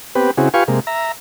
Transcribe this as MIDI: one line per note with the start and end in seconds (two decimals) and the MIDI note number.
0.15 0.31 59
0.15 0.31 60
0.15 0.31 67
0.15 0.31 71
0.38 0.49 49
0.38 0.49 60
0.38 0.49 64
0.38 0.49 66
0.38 0.49 68
0.54 0.64 65
0.54 0.64 67
0.54 0.64 71
0.54 0.64 77
0.54 0.64 80
0.54 0.64 85
0.68 0.80 48
0.68 0.80 56
0.68 0.80 58
0.87 1.12 76
0.87 1.12 82